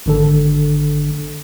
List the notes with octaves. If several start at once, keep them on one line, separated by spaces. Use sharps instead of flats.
G#1 D3 A4